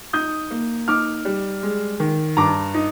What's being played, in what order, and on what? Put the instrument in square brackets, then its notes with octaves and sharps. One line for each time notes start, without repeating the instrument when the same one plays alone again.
[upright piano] D#4 D#6 G6
A#3
D#4 D6 F6
G3
G#3
D#3
G2 A#5 D6
D#4